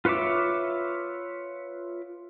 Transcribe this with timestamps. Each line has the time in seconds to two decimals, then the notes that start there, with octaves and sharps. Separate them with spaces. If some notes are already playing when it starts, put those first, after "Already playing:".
0.05 F4 B4 C#5 E5 D6